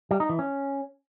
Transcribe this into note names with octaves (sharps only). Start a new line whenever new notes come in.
G3
D#4
E3
C#4